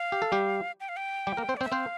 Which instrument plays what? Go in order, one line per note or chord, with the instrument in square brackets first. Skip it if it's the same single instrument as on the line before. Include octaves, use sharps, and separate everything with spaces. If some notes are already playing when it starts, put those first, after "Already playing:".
Already playing: [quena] F5
[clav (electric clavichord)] G4
A4
G3 G4
[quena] G5
F5
G5
[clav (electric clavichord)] G3 G4
A#3 A#4
C4 C5
[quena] D5
[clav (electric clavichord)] C4 C5
[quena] E5
[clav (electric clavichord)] C4 C5 [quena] F5